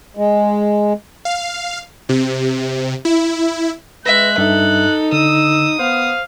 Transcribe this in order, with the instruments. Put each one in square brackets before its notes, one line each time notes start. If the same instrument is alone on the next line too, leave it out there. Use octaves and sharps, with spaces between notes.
[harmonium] G#3
[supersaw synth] F5
C3
E4
[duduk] G#3 [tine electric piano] B4 A#6 [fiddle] E5 [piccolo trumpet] F#6
[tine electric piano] G2 E5 [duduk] D#4 [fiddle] A4
[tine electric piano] D3 [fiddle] D#6 [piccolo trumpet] E6
[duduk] B3 [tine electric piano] C5 [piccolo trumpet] F5